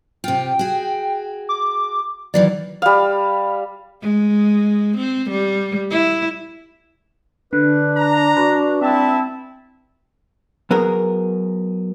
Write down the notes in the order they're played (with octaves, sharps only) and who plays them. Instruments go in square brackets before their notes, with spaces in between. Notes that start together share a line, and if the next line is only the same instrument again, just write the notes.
[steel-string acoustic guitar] C3 F4 [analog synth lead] G5
[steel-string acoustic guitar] F#4 G#4
[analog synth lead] D6
[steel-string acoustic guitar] D#3 E3 F#3 [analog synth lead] D5
[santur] G3 F5
[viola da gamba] G#3
C4
G3
E4
[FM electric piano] D3 [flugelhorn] D4 [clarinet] B4
[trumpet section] A#5
[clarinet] F#4 [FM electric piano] B4
[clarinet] C4 [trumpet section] E4 E5 A5
[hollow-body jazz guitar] F#3 B3 G#4 A#4